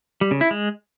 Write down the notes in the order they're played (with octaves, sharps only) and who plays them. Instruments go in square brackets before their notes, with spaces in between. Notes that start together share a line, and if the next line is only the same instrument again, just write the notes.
[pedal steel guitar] G3
C#3
E4
G#3